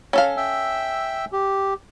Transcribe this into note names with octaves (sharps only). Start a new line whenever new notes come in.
C#4 A4 F5
E5 G5 E6
G4